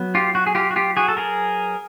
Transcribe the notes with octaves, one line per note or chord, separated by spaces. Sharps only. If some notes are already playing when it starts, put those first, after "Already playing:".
Already playing: F#3 B3
F4 G4
F#4
G#4
F4 G4
F#4
F4 G4
F#4 G#4
A4
G#4 A#4